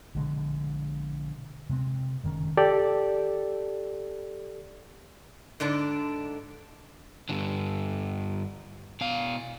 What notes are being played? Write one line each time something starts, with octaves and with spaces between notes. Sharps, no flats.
A#1 B2 D3 G#3
C3 G#3 B3 C4
F#1 D#3 G#3 C#4
G4 A4 D5
G#2 D3 D4 D5
G2 D3
B2 F5